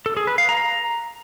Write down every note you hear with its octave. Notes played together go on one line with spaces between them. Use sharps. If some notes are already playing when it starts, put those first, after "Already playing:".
A4
G#4
B4
F5
A#5